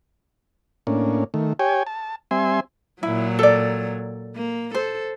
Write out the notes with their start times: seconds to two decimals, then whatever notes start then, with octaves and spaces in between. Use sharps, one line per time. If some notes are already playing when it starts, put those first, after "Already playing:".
0.87 A2 A#3 C#4 D4
1.34 D#3 A3
1.59 G4 C#5 G5 G#5
1.86 A5
2.31 G3 C4 E5 G#5 C6
3.03 A#2 F#3 E4
3.39 A4 D5
4.36 A#3
4.74 A4 C5